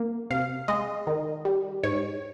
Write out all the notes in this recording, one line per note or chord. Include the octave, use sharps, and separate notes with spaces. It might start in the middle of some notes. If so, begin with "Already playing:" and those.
Already playing: A#3
C3 F5
G#3 D#5
D#3
G3
G#2 C#5